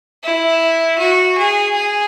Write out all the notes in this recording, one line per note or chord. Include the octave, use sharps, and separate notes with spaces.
E4
F#4
G#4
G#4